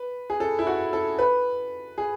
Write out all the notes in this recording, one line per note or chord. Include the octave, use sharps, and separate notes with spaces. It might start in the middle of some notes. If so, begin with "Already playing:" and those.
Already playing: B4
G#4
A4
E4
F#4
A4
B4
G#4